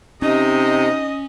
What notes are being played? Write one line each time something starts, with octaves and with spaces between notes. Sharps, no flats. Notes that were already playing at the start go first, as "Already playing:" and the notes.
C3 C#4 D#4 D#5